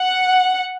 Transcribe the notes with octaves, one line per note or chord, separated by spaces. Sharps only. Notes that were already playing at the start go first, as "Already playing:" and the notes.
Already playing: F#5